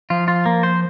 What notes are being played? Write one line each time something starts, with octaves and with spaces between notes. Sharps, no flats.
F3 F4
F4
A#3
C5